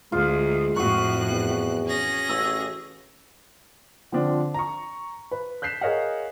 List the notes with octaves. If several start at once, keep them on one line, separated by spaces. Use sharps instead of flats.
D2 G#3 F4
F2 A2 F#4 C#6 F#6
E2
C#4 G#4 A#6
A1 E6
D3 F3 C4 D4
A#5 C#6
B4
F#6 G6 B6 C7 E7
G#4 A#4 C#5 D#5 F5 F#5